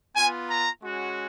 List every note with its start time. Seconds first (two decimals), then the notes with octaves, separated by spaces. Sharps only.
0.15 B3 F4 G#5
0.49 A#5
0.81 G#3 C#4 F#4